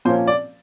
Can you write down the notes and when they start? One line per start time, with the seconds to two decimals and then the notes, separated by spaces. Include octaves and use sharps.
0.05 A#2 F3 A#3 C#4 C5
0.27 D5